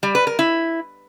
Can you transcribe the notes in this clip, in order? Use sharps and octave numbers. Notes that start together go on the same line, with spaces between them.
G3
B4
A#4
E4